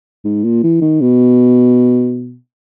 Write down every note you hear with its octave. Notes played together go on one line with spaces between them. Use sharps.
G#2
A#2
E3
D#3
B2